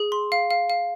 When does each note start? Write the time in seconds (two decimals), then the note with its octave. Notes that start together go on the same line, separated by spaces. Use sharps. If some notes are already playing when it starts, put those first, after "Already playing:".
Already playing: G#4
0.12 C6
0.32 F5
0.51 F5
0.70 F5